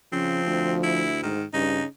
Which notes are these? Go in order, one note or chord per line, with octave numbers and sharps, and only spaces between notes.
C#3 F3 C4
D2
E4
G#2 D#3
G2 C#3 D#4